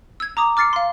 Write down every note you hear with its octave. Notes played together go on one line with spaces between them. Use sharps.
E6 G#6
A#5 D6 D#6
D6 F6 A6 C7 C#7
F5 C6